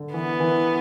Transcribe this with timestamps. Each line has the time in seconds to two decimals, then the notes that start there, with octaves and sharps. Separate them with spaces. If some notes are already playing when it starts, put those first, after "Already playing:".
Already playing: D3
0.13 E3 B3
0.40 E3